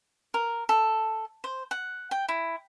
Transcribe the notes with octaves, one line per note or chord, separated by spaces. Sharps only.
A#4
A4
C5
F#5
G5
E4